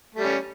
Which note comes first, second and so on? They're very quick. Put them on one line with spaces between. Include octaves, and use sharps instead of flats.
A3 G3 C#4